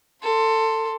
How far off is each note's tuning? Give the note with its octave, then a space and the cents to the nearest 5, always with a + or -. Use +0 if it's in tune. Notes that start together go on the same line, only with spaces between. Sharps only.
A4 +20 C6 +0